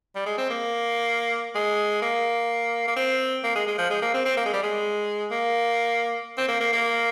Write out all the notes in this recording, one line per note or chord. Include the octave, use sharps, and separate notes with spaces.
G3
G#3
C4
A#3
G#3
A#3
A#3
C4
A#3
G#3
G#3
F3
G#3
A#3
C4
C4
A#3
G#3
G3
G#3
A#3
C4
A#3
A#3
A#3